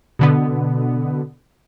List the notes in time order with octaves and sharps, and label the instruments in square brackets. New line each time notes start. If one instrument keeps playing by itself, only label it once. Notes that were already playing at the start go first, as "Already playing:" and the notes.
[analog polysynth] B2 D3 B3